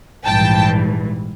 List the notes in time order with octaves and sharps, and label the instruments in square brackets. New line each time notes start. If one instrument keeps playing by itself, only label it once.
[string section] A#1 G#2 E3 G3 G5 A5